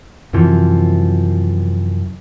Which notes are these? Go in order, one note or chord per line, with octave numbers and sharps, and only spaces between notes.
F#2 C3 E3 F3